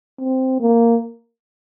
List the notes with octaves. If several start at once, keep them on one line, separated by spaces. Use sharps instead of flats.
C4
A#3